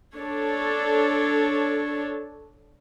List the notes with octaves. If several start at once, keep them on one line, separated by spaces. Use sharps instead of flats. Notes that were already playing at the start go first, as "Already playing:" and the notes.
D4 A4 C#5